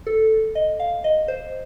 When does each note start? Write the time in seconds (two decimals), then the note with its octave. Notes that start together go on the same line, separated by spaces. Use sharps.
0.07 A4
0.55 D#5
0.80 F5
1.04 D#5
1.28 C5